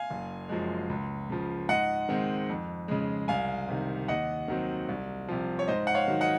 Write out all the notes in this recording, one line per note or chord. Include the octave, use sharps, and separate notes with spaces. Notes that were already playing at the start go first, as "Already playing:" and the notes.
Already playing: F5 G#5
F#1
F#2 F3 G#3
C#2
C#3 F3
G#2 D#5 F#5
D#3 G#3 C4
F2
C#3 G#3
C2 F5 G#5
C3 D#3
D#2 D#5 F#5
D#3 F#3 C4
C2
C3 F3
C#5
G#2 C5 D#5
F#5
C#5 F5
D#3 F#3
D#5 F#5